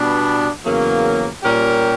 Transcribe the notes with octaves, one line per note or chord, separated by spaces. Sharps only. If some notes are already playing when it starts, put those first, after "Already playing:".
Already playing: B2 G3 B3 D4
E2 C#3 F#3 A#3
A#2 G3 C#4 G4 A#4